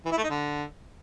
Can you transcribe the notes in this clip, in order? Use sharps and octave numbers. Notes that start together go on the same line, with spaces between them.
E3
E4
A3
D#4
D3